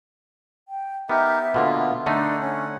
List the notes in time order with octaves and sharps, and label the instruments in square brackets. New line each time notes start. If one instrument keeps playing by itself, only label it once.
[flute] G5
[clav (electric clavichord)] B3 [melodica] D#4 G4 A#4 [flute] E5
[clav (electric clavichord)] B2 D3 A#3 [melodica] B3 F4
[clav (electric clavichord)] D3 A3 D#4 [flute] D4 [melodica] F#5
[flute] C#4